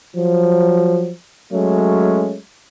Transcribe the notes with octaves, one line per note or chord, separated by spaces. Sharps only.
F3 F#3
F#3 G#3 A3 C#4